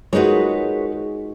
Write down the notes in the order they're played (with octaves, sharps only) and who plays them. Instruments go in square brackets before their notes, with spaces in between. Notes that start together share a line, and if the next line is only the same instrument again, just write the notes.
[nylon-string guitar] G#3 D#4 F#4 [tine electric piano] F4 G#4 A#4 [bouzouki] B4 C#5